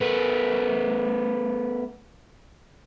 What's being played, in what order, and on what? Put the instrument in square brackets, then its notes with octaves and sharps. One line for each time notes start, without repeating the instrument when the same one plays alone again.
[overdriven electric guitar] A3 B3